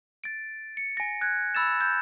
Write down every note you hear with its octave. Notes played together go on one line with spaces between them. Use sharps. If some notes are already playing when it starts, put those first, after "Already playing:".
A6 D7
C#7
G#5 A#6
F#6 G#6
B5 E6 A6 E7
G6